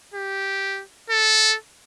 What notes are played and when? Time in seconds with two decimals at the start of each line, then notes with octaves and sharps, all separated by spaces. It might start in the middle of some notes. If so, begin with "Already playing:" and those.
0.14 G4
1.10 A4